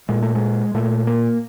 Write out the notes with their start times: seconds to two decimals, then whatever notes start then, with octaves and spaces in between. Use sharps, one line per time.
0.09 A#2 G#3
0.22 A3
0.35 G#3
0.74 A#2 A3
1.07 A#3